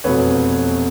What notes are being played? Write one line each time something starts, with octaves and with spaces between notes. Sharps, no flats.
F1 E2 B2 B4 C#5